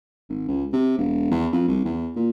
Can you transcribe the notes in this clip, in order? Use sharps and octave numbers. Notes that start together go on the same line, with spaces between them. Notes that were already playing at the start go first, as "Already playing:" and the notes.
G#1
C#2
C3
E1
E2
F2
C2
E2
A#2